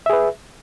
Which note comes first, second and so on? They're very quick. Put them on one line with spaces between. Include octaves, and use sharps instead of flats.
E5 G#4 B4